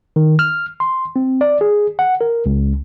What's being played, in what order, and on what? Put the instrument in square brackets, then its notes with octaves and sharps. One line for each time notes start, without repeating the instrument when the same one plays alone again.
[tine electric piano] D#3
F6
C6
C4
D5
G#4
F#5
A#4
C#2